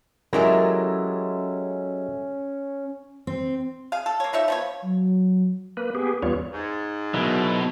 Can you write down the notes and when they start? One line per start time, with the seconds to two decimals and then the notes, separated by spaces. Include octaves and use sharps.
0.33 F#3 G#3 A3 C#4 E4 G4 A#4
3.27 C4
3.92 G#4 F5
4.06 A4
4.20 A#3 C#5
4.33 F3 D#4 C#5 E5
4.48 F3 B3 C#5
4.82 F#3
5.77 A#3 B4
5.95 B3 G4 G#4
6.23 E2 G3 B3 F4 C#5
6.53 G#2
7.14 B2 F#3 E4 A#4